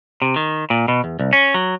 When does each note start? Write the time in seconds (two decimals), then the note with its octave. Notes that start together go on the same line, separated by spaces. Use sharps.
0.22 C3
0.36 D#3
0.70 A#2
0.88 B2
1.04 E2
1.19 C2
1.33 C#4
1.54 F#3